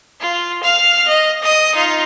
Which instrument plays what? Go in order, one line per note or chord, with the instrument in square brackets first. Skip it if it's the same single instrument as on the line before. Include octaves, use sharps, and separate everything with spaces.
[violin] F4
F5 F6
D#5
D#5 D#6
D#4 F4